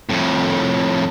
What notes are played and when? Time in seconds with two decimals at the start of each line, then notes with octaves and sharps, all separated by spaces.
0.09 F2 A2